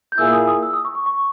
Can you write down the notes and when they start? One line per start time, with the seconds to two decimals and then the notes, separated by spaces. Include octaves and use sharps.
0.12 G6
0.18 A#2 A#3 E4 G#4 E6
0.33 D#6
0.48 D#6
0.63 E6
0.73 D#6
0.85 C#6
0.95 C#6
1.06 C#6